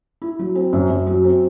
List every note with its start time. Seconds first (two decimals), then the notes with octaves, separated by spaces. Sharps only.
0.22 E4
0.39 F#3
0.55 C4
0.73 F#2
0.90 F#2
1.07 F#3
1.24 C4